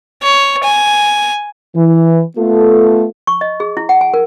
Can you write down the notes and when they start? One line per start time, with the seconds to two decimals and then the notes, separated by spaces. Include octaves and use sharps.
0.23 C#5
0.63 G#5
1.75 E3
2.36 A3 B3 F4 A4
3.27 C#6
3.41 D#5
3.60 G#4
3.77 E4
3.89 F#5
4.01 G#5
4.14 A#4